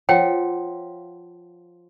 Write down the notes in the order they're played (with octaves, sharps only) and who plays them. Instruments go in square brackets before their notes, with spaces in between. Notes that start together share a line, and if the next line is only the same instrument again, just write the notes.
[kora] F3 [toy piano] C#5 F#5 G5